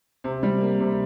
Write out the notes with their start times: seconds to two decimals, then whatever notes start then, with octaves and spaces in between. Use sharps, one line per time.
0.24 C3
0.43 G3
0.61 A#3
0.80 C3